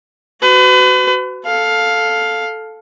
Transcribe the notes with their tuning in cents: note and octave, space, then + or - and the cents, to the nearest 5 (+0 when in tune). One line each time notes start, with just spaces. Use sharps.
F#4 +15 B4 +40
A4 +0 F5 +10